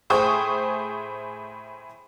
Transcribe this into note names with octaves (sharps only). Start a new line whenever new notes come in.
A2 G#4 C5 G5 C#6 D#6